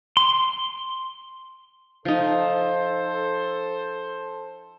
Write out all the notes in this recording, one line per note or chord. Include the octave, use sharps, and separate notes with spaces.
C6
F3 D#4 A4 C5